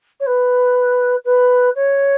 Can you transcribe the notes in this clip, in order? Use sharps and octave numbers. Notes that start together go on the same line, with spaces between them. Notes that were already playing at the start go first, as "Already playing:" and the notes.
C#5
B4
B4
C#5